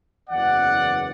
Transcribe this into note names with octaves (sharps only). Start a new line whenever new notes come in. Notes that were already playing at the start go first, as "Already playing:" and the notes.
F#1 E2 E3 B3 D5 F#5